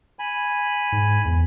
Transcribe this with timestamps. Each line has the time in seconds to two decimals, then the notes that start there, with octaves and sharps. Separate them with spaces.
0.19 G#5 B5
0.92 G#2
1.25 E2